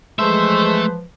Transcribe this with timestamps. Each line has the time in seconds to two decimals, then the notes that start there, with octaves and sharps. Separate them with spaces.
0.19 E3 F3 G#3 A3 B4 C5 E5